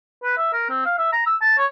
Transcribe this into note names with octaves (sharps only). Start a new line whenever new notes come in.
B4
E5
A#4
C4
F5
E5
A#5
E6
A5
C#5